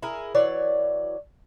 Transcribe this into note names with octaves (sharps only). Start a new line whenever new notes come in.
E4 G#4 A#4
E3 F#3 C#5 D5